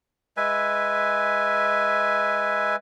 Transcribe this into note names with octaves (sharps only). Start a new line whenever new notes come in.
G#3 B4 E5 G#5